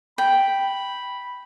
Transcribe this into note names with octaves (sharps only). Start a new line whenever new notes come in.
G5 B5